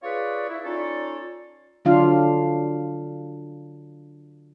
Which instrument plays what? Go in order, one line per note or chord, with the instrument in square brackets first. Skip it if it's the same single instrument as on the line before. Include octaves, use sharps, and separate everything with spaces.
[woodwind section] F4 G#4 B4 C#5 D5
E4
C#4 D#4 F4 A4 C#5 D5
[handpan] D3 F#3 D4 F4 F5